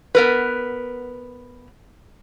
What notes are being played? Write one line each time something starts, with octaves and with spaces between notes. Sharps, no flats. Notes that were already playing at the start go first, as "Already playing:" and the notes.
B3 A#4 B4